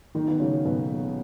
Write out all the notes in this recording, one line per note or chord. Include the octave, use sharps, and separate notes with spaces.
B1 D#3 D#4
B3
C#3 F#3 C#4
B1 B2 B3
A#2